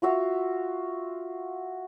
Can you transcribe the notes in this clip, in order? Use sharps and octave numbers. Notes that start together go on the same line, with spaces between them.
F4 F#4 E5 F5